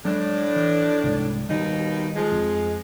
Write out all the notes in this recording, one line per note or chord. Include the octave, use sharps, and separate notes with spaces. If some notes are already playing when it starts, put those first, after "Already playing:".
A2 F#3 G#3 D4
E3
C2 G#2
D#2 B2 D#3 G3 D#4
F3 G#3
F2